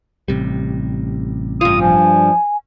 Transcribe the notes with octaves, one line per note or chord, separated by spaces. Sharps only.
A1 C3 G3
G2 F4 D#6
F3 G#5